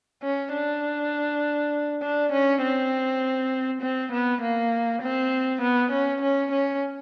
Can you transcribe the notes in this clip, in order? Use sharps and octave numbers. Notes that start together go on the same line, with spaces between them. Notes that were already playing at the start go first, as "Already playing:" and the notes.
C#4
D4
D4
C#4
C4
C4
B3
A#3
C4
B3
C#4
C#4
C#4